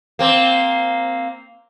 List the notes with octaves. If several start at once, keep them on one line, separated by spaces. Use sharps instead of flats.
A#3 C4